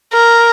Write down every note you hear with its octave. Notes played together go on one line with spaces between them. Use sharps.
A#4